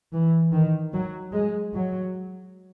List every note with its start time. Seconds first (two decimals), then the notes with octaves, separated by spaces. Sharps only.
0.13 E3
0.53 D#3
0.93 F#3
1.32 G#3
1.73 F#3